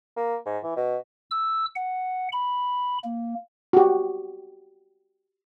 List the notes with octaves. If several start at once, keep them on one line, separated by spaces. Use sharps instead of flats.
A#3
G#2
E3
B2
E6
F#5
B5
A#3
F#4 G4